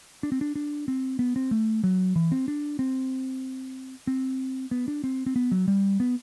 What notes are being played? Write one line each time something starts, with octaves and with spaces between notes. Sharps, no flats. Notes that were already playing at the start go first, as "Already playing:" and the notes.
D4
C4
D4
D4
C4
B3
C4
A3
F#3
E3
C4
D4
C4
C4
B3
D4
C4
C4
B3
F#3
G3
B3